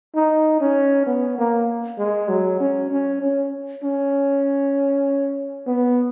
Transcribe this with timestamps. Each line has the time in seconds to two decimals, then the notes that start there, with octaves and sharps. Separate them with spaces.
0.15 D#4
0.61 C#4
1.06 B3
1.38 A#3
1.98 G#3
2.29 F#3
2.60 C#4
2.90 C#4
3.22 C#4
3.83 C#4
5.66 B3